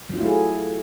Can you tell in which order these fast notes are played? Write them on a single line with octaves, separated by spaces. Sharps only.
F#3 F4 E4 A3 G#4